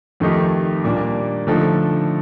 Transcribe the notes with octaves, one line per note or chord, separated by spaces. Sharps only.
F2 D#3 A3 D#4 G4
A#2 G3 A#3 D4
D3 F3 A3 D#4 A4